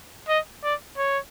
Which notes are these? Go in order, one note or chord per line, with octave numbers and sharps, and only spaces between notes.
D#5
D5
C#5